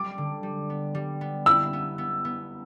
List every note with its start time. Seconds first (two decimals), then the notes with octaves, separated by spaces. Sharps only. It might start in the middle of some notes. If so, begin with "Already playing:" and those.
Already playing: G3 D6
0.18 D3
0.43 G3
0.70 B3
0.95 G3
1.21 B3
1.46 E4 E6
1.73 B3
1.98 B3
2.25 B3